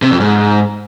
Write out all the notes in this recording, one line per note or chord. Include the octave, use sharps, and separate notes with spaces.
C3
F2
G#2